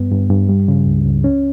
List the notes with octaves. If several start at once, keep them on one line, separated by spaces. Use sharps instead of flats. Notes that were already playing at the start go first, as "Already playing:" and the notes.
Already playing: G2 B3
G2
G2
G3
C#3
C#2
C#2
C#4